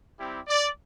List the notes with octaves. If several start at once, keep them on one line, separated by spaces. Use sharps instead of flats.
G3 C4 E4 G4
D5